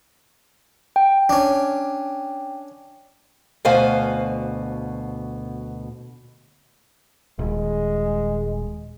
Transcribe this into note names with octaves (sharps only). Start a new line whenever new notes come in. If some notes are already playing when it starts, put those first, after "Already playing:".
G5
C#4 D4
D2 B2 C5 F5 G#5
D#1 G#3